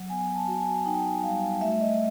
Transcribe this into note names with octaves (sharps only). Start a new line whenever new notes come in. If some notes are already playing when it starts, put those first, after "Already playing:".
Already playing: F#3
B3 G#5
A5
F#4
G#5
D#4 G5
G3 F5
A3 E5
D#5